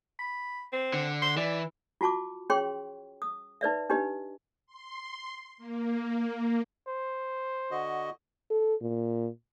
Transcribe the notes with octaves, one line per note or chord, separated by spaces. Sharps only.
B5
C4
D3
C6
E3 D5
F4 F#4 A5 C#6 D6
C#4 G#4 C#5 G5 C6 C#6
D#6
D#4 B4 D5 E5
D4 D#4 G4 B4 D#5
C6
A#3
C5
D3 F#4 D#5
A4
A#2